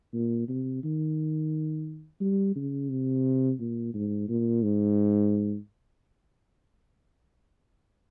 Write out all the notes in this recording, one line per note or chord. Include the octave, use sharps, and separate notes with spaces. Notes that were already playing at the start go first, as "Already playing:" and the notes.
A#2
C3
D#3
G3
C#3
C3
A#2
G#2
A#2
G#2